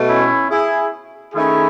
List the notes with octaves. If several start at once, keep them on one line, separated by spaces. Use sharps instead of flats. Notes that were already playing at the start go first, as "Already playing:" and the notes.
Already playing: B2 A3
C#4 E4
E4 G#4
D#3 A3 C#4 E4 G#4